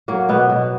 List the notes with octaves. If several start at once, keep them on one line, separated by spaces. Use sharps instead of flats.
F#3 A#3
B2 B3
B2